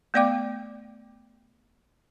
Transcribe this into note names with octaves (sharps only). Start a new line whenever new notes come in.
A3 B3 D5 F5 G5 D6